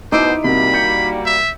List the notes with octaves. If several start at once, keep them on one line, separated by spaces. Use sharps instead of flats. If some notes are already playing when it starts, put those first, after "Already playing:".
B2 D#4 E4 C5 D6 E6 D7
C3 G3 A#3 F#4 B5
G6 C#7
E5